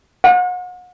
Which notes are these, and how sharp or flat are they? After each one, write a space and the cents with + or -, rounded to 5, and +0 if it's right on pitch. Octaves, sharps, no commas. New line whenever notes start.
F#5 -35